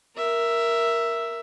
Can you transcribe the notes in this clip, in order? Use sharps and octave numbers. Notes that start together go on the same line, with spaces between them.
A#4 E5